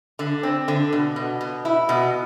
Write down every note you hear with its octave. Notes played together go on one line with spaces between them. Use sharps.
D3
C4
D3
B2
B2
B2
E4
B2